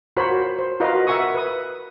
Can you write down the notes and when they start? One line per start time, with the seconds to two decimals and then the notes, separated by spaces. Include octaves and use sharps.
0.17 F4 F#4 A#4 C5 C#5 B5
0.59 C5
0.80 F4 F#4 A#4 B4 D#5 F5
1.07 A#4 E5 F#5 G#5 C#6 D#6
1.35 B4 D#6